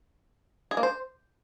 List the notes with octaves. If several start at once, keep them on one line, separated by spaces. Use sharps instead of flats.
G#4
A#3
C5